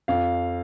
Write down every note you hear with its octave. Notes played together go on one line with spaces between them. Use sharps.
F2 F5